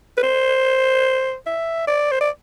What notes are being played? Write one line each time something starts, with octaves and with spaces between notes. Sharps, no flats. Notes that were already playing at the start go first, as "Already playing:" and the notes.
B4
C5
E5
D5
C5
D5